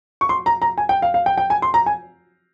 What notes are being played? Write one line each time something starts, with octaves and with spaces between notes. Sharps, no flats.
C#6
C6
A#5
A#5
G#5
G5
F5
F5
G5
G5
G#5
C6
A#5
G#5